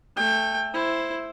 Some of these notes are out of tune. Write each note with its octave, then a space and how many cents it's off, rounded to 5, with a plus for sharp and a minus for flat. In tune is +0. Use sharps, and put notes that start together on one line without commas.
A3 +0 G5 +25
E4 +5 C5 +5